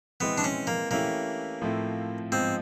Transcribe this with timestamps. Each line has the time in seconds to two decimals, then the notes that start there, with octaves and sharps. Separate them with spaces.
0.21 E3 G#3 B3 C4
0.38 D4
0.44 C#4
0.67 A#3
0.91 E3 A3 A#3 C#4 E4 G4
1.62 A2 F3 A3 C4 E4
2.32 G#2 F3 G#3 B3 C4